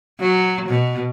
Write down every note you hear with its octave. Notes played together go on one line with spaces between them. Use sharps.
F#3
B2